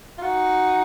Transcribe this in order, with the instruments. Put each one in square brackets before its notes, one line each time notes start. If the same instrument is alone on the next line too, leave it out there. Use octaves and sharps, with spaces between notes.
[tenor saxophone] F4
[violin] D#4 [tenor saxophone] F#4